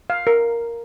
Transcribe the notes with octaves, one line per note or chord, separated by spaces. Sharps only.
F5
A#4